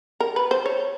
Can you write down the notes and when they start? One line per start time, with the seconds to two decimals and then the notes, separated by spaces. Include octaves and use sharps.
0.20 A#4
0.36 B4
0.51 C5
0.66 C#5